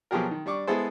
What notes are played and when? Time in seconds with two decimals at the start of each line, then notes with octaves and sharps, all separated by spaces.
0.11 B2 F3 F#3 G4 G#4 A#4
0.31 D#3
0.46 G3 D4 C#6 D6
0.67 G#3 B3 E4 G#4 A4 C5